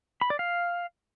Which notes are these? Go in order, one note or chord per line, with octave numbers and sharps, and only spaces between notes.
B5
D5
F5